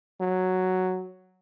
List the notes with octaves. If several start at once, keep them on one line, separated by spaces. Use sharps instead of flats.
F#3